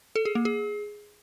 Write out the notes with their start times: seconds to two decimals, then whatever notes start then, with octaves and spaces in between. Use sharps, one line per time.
0.16 A4
0.25 G#4
0.35 A#3
0.45 G#4